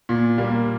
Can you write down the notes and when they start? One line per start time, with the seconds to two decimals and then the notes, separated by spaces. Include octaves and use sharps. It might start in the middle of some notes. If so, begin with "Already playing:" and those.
0.09 A#2
0.38 G3 A#3